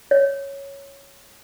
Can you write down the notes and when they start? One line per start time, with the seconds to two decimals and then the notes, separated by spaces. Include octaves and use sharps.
0.11 C#5